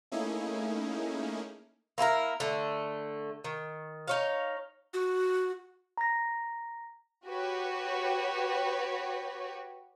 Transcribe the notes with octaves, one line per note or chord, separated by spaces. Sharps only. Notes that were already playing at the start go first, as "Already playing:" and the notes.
A3 A#3 C#4 D#4 E4 G#4
A#3 E4 A4 A#4
D3 A3
D#3
D#4 C#5 F5
F#4
A#5 A#6
F#4 G4 B4 C#5